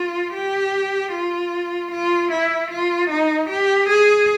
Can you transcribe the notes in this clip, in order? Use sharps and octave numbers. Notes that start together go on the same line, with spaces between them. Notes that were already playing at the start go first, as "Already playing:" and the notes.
Already playing: F4
G4
F4
F4
E4
F4
D#4
G4
G#4